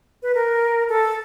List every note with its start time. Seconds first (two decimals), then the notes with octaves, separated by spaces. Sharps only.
0.23 B4
0.34 A#4
0.89 A4